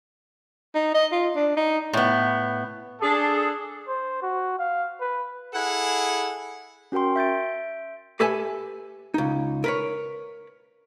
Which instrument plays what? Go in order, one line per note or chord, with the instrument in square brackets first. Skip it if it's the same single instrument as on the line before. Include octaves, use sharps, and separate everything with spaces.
[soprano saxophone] D#4
D#5
F4
D4
D#4
[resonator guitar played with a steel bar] A2 B3
[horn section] D4 G#4 A4
[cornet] C5
F#4
F5
B4
[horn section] E4 G#4 A4 F#5
[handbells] C#4 F#4 A#4 G5 C6
E5 G6 A6 D7
[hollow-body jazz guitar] G4 A4 B4 E5 G#5
C#2 D#4
A#4 B4 C#5